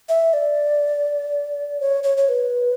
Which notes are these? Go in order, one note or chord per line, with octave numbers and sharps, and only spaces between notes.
E5
D5
C#5
C#5
C#5
B4